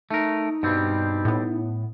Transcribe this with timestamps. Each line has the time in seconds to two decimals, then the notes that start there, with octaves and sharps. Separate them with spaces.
0.11 A3 D#4 A#4
0.63 G2 B2 G3 C4
1.25 A2 B3